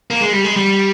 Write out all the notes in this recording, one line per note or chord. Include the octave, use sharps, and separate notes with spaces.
A#3
G#3
G3
G#3
G3